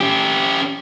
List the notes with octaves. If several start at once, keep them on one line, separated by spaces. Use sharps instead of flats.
C#4 G4